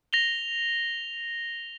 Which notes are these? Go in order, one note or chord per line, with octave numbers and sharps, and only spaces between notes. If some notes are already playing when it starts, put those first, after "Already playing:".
A#6 F7 G7